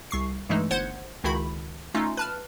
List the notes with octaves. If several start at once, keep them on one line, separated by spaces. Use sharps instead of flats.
C2 C#6 C7
G2 E3 G#3 A3 D#4
G1 C5 F#5 G#6
C#2 D#3 E4 F#4 B5
A3 C#4 D#4 F4
B4 A5 F6